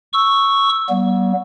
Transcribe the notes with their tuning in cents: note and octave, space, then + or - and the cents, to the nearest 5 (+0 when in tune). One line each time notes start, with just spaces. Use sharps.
C#6 +0 E6 +0
G3 -45 B3 -40